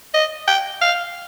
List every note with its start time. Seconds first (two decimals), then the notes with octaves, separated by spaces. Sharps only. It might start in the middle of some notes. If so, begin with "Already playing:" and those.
0.14 D#5
0.47 G5
0.81 F5